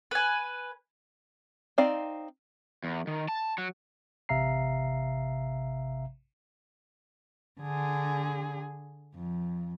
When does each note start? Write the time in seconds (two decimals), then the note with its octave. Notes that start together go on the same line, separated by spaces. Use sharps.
0.11 B4 G#5
1.78 C4 D#4 D5 F5
2.84 E2
3.07 D#3
3.28 A5
3.58 F#3
4.29 A1 C3 E5 F5 A#5 C7
7.61 D3 G#4
9.15 F2